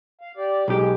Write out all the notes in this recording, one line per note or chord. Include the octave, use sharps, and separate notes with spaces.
F5
G4 D5
B1 G#3 G4